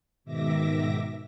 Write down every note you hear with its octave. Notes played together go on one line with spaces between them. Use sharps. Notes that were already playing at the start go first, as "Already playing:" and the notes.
G#2 B2 D#3 E5 D6 A#6